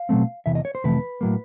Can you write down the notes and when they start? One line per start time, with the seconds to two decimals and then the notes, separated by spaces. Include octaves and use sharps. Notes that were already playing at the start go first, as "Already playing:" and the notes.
Already playing: F5
0.09 B2 F#3 A3 C4
0.46 E2 C3 E3 E5
0.55 D#5
0.65 C#5
0.75 C5
0.84 F2 C3 E3 A3 B4
1.21 A2 F#3 A#3